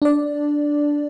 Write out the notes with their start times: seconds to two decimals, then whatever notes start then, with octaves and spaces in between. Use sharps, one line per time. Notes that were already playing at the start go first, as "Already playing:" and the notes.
0.02 D4 D5